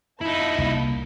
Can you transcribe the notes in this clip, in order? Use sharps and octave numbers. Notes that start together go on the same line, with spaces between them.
D#4 E4 F5 A5 B5
C2 F#3 A#3